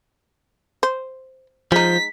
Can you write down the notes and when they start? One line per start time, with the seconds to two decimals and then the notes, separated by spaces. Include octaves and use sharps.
0.83 C5
1.72 F3 G#3 D#4 B6